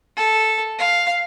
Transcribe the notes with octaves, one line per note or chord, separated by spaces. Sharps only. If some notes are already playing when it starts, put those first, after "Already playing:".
A4
F5